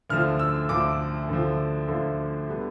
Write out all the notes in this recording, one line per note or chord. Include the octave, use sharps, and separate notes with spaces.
D2 D3 F3 F6
E6
D2 D3 F3 D6
D2 D3 F3
D2 D3 F3
D3 G3 B3